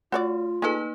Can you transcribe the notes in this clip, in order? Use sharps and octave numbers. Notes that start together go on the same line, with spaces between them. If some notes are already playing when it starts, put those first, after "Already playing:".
A3 F4 F#4 C#5 D5
A#3 D#4 G#4 A4 B4